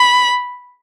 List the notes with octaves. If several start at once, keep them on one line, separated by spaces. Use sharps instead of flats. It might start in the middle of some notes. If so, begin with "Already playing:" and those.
Already playing: B5